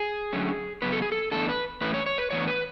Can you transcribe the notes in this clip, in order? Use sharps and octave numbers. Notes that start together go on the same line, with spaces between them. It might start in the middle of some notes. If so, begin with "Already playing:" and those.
Already playing: G#4
D3 F#3 A3 C#4
C#3 F#3 B3 B4
A4
G#4
A4
A2 E3 B3 D4 A4
B4
A2 E3 A3 C#4 B4
C#5
C#5
B4
A2 E3 B3 D4 C#5
B4